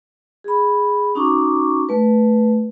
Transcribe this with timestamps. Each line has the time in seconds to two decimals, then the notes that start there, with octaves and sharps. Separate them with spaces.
0.44 G#4 B5
1.15 C#4 D#4 F#4 A#5 C#6 D6
1.89 A3 B4